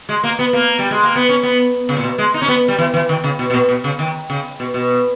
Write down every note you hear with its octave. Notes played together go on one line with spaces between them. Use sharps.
G#3
A#3
B3
A#3
G3
G#3
A#3
B3
C#4
B3
C#3
A#2
B2
G#3
D#4
C#4
B3
G3
E3
E3
D#3
C#3
B2
B2
A#2
B2
C#3
D#3
C#3
B2
B2